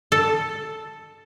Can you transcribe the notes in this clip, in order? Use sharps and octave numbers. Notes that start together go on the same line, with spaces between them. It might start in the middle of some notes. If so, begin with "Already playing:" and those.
A4